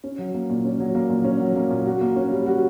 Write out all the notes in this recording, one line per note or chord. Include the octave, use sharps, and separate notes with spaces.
C#4
F#3
A#3
A#2
C#4
F#3
A#3
A#2
C#4
F#3
A#3
A#2
F#4
A#3
C#4
G3
F#4